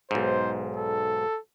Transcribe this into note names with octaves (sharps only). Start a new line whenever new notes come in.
B1 G#2 C5
A4